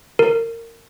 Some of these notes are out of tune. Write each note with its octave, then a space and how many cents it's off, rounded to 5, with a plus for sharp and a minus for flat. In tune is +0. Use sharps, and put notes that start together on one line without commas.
A#4 -25